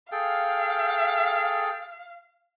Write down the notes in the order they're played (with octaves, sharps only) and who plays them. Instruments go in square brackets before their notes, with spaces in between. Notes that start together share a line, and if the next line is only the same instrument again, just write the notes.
[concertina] G#4 A4 G5 [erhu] F5